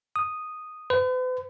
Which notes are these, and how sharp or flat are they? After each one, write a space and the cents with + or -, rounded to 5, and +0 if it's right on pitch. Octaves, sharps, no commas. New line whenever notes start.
D#6 -5
B4 +45